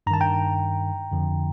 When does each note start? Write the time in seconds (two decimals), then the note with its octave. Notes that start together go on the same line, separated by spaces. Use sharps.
0.07 G2 A#5
0.11 D#3 A5
0.21 G5 A#5
1.12 F2 D3 F3